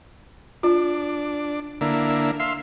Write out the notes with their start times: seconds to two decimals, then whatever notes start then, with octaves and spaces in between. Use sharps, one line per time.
0.63 D4 F4
1.81 D3 A#3 E4
2.40 E5 F5 C6